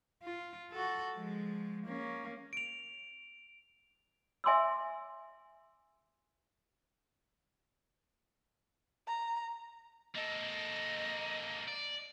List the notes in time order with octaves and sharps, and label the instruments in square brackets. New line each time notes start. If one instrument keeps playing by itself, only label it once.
[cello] F4
F#4 A4
F3 G#3
A#3 C#4
[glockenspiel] D7 F7
[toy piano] E5 G#5 C6 D6 E6
[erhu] A#5
[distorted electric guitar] A#3 A4 [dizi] D#5
[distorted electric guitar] D5